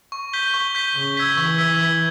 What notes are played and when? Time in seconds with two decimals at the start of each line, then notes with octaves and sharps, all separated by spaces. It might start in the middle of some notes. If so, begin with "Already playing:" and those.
0.12 C#6
0.33 G6 B6 G7
0.54 C#6
0.75 G6 B6 G7
0.95 C#3 C#6
1.17 E6 G#6 B6 G7
1.37 E3 C#6
1.58 E6 G#6 B6 G7
1.79 G#6